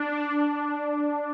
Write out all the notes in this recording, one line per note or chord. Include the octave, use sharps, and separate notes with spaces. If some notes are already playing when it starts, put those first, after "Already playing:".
Already playing: D4